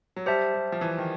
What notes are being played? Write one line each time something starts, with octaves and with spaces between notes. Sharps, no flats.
F#3
G3 G4 C5 E5 A5
G3
F3
E3
D#3